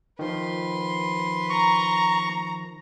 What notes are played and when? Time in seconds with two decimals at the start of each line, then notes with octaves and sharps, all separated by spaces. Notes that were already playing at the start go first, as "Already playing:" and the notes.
0.19 D#3 F3 B4 C6
1.50 A#5 C#6